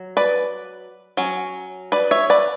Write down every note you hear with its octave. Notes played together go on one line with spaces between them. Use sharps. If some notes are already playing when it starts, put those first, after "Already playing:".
Already playing: F#3
B4 D5
F#3 C#4
B4 D5
C#5 E5
B4 D5